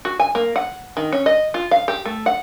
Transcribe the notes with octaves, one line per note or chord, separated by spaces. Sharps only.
F#4
G#5
A#3
F#5
D#3
C#4
D#5
F4
F5
G4
A3
F#5